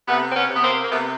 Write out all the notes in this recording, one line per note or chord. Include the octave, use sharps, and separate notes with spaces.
C3 A3 B3
C4
B3 C#4
C3
B3
A#3 C4
A#3
C3 A3 B3